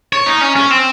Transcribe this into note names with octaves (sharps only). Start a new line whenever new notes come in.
C#5
D#4
C#4
C#4
C4